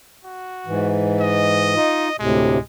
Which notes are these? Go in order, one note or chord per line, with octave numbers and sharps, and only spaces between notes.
F#4
G#2 E3
D#5
D#4 F4
D2 A2 C3 G#3